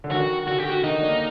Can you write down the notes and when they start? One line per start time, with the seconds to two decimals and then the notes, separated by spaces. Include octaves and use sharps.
0.04 D3
0.11 D#3 F#4
0.48 D3 F#4
0.59 G4
0.70 F#4
0.83 D#3 D#4
1.02 A#3 D4